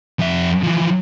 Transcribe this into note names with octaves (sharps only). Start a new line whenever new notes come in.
F2 E5
E3 F3